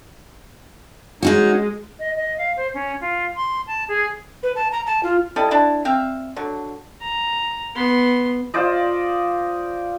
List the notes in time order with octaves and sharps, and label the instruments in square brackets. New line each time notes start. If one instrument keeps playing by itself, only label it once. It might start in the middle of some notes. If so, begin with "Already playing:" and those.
[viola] G#3 [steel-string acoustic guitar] C#4 D#4 F#4
[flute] D#5
D#5
F5
C5
C#4
F4
C6
A5
G#4
[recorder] B4
A5
A#5
A5
F4
[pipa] G3 E4 A4 D#5
D4 E4 A5
C4 E5 F5
D3 F#3
[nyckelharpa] A#5
B3 C6
[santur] F4 C5 D5 D#5